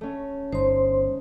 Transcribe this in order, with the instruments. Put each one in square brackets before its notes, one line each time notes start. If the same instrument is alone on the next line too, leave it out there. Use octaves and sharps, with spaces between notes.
[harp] A3 C#4
[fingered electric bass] G1 [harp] D#4 [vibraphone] C5 C6